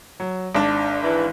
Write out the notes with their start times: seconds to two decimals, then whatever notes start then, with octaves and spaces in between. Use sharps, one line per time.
0.20 F#3
0.55 G#1 D4
1.01 E3